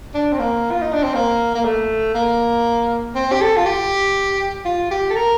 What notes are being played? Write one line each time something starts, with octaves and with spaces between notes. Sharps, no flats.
D4
C4
A#3
F4
D#4
D4
C4
A#3
A#3
A3
A#3
C4
G4
A4
F4
G4
F4
G4
A4
A#4